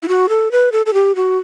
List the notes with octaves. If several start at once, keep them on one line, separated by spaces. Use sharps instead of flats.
E4
F#4
A4
B4
A4
A4
G4
F#4